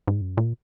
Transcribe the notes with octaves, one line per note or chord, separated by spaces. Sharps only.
G#2
F#2
A#2